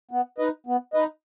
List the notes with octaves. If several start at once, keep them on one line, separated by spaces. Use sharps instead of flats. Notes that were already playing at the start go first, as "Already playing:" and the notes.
B3
D#4 B4 D#5
B3
D#4 B4 D#5